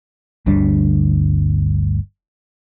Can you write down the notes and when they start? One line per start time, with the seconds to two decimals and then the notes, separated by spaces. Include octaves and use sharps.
0.46 G1 D2 G3 D4